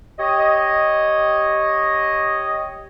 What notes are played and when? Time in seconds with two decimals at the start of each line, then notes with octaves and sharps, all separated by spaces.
0.18 G4 C#5 D#5